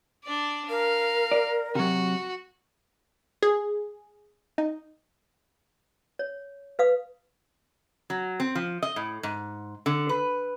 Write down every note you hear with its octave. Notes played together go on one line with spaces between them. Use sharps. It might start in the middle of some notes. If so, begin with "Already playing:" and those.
D4 D5
A#4 F5
D5
C3 F#3 F#4
G#4
D#4
C#5
B4 F5 D#6
F#3
C4
F3
D#5
A2
G#2
D3
B4